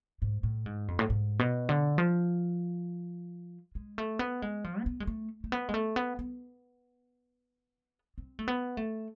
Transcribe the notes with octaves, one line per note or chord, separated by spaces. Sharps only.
G#2
A2
G#2
F2
A2
G#2
B2
D3
F3
G#3
A3
B3
G#3
F3
C4
B3
G#3
A3
A3
B3
G#3
A3
B3
B3
C4
A3
B3
A3